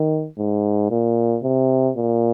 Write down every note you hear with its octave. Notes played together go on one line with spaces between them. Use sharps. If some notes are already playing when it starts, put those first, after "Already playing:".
Already playing: D#3
G#2
A#2
C3
A#2